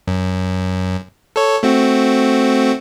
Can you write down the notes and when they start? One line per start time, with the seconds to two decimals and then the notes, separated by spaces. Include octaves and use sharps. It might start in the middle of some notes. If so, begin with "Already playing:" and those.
0.08 F#2
1.36 A4 C#5
1.63 A3 C4 F#4